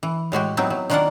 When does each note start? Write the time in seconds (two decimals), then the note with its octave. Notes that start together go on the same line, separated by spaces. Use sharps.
0.03 E3
0.32 A2 G#3 F#4 G4
0.57 F#3 B3 C4 D#4 E4
0.70 F#3
0.90 D#3 A#3 D4 F4 A#4 F#5